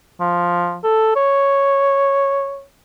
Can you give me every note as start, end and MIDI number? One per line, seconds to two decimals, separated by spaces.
0.20 0.77 53
0.84 1.16 69
1.16 2.63 73